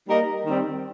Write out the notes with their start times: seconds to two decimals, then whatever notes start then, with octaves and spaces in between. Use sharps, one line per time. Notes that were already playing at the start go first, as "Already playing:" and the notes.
0.06 G3 A#3 D#4 A#4 D#5
0.45 D#3 G3 C4